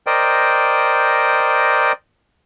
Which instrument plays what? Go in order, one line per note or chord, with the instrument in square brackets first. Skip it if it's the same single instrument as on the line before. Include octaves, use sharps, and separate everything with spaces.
[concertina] A#4 C5 D5 D#5 G5